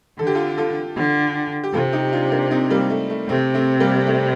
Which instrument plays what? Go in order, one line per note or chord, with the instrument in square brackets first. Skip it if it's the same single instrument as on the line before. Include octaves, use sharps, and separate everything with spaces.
[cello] D3 [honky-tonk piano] A4
[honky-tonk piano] G4
F4 A4
F4 A4
[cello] D3
[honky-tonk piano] G4
[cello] C3 [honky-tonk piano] F4 A4
[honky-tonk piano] D#4 G4
D4 F4
A#3 D4
C4 D#4
G3 A#3
A3
A3
[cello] C3 [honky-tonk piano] A3 C4
[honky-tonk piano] A3 C4
G3 A#3
A3